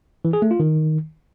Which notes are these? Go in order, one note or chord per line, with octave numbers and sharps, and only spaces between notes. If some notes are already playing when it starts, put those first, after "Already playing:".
E3
G#4
A3
F4
D#3